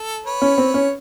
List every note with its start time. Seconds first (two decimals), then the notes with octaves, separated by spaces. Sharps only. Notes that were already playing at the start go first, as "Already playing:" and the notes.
Already playing: A4
0.26 B4 C#5
0.42 C#4
0.58 C4
0.74 C#4